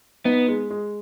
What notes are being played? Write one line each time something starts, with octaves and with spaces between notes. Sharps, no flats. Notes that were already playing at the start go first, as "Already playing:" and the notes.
B3 D#4
G#3
G#3